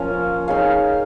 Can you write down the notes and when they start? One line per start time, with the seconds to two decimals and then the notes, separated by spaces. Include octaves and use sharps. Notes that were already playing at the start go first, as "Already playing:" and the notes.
Already playing: F3 A#3 C#4
0.48 D#4 G#4 C#5 F5